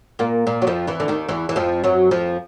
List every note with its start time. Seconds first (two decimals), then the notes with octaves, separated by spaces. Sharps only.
0.19 A#2 A#3
0.47 A#2 A#3
0.62 F#3
0.67 F2 F3
0.87 E2 E3
1.00 D3
1.08 D#2 D#3
1.28 E2 E3
1.49 E3
1.56 F2 F3
1.84 F#2 F#3
2.11 F2 F3